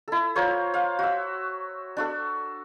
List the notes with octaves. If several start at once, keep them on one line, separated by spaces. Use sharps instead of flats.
E4 A4
F4 A#4 C5 C#5
F5
F#4 E5
D4 F#4 A4